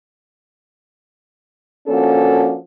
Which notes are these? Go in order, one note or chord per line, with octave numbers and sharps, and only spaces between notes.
F3 A#3 C#4 D4 F#4 A4